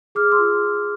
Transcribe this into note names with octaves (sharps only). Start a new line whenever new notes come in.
G#4 D6 F6
C6 E6
F4